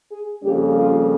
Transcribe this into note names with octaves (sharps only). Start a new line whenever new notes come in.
G#4
F2 C#3 G3 A#3 C#4 G4
F4